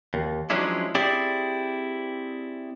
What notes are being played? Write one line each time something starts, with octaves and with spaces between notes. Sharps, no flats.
D#2
F3 F#3 G#3 C#4 D4 E4
C4 E4 G4 G#4 D5